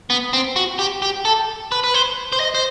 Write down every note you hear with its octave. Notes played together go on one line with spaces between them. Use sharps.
B3
C4
F#4
G4
G4
A4
B4
B4
C5
C5
D#5
C5